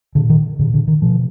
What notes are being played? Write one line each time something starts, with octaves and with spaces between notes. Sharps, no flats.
A#2 D3
D#3
A#2 D3
D3
D#3
B2 F3